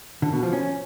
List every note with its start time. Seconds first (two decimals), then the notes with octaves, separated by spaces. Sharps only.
0.22 D3
0.33 B2
0.43 F3
0.53 C#4